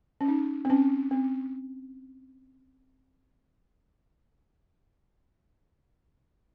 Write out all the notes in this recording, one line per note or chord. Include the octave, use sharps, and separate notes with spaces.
C#4
D#4
C4
C#4
C4